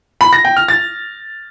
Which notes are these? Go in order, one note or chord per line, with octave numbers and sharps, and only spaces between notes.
B5
A#6
G5
F6
A6